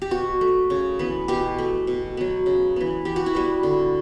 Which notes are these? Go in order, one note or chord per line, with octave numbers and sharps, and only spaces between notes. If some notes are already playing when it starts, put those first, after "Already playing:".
G4
B2 F#4
A3
C#3
E3 B3
B2 G4
A3
B2
F#3 B3
C#3
E3 B3
E3 G4
F#4
E4
G3 B3 F#4
D3